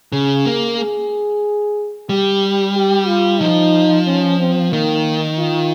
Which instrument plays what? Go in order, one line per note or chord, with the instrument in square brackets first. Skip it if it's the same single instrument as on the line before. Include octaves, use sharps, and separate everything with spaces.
[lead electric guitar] C#3 [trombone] G#4
[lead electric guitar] A#3
[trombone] G#4
[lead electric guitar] G3 [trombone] G4
[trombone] G4
F4
[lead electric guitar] F3 [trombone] D#4
[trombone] C#4
C4
[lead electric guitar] D#3 [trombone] A#3
[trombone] F4